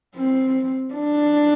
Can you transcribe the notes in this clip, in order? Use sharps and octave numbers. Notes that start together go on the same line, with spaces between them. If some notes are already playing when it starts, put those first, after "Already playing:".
C4
D4